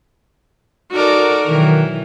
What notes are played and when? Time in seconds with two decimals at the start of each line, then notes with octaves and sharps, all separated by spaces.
0.92 D#4 F#4 A4 A#4 D5
1.47 B2 D#3 E3 F#3